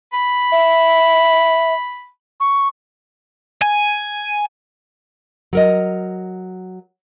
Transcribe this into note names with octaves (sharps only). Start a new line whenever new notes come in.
B5
E5
C#6
G#5
F#3 A#4 D#5